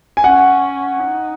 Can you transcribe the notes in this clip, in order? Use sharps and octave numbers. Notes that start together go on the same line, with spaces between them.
G#5
C#4 F#5
D#4